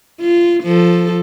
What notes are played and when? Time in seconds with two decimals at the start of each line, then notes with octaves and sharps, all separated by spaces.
0.21 F4
0.64 F3 A4